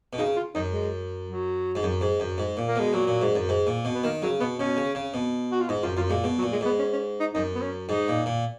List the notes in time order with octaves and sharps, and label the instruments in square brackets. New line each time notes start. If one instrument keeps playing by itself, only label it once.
[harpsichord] B2
[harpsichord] C#3 [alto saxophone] D#4
[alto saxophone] F4
[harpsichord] F#2 [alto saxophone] D#4
[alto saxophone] G#3
F#3
[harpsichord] G#2
F#2
G#2
F#2
G#2
A#2
[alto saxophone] A#3
[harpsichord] B2 [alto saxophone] G#3
[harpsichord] A#2 [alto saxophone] F#3
[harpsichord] A#2
G#2
F#2
G#2
A#2
B2
[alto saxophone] B3
[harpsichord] D#3 [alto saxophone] A#3
[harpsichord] C#3 [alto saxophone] F#3
[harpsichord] B2 [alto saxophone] B3
[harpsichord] B2 [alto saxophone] C#4
[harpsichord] C#3
C#3
B2
[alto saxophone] F#4
F4
[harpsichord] G#2 [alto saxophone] D#4
[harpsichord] F#2 [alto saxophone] F4
[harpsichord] F#2 [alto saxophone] F4
[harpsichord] A#2 [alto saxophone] G#3
[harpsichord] B2 [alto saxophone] G#3
[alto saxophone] F#3
[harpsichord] A#2
[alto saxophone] G#3
[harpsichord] G#2 [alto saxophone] B3
[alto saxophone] C#4
C#4
D#4
[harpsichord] F#2 [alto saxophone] D#4
[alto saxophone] B3
C#4
[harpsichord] G#2 [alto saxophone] D#4
[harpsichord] A#2
A#2